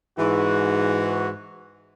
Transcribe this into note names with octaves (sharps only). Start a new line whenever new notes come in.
G#2 E3 F#4